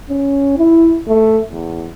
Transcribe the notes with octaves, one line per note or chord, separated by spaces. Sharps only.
C#4
E4
A3
E2